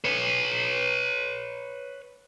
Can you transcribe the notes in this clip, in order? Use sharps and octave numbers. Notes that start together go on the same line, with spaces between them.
B4 C#5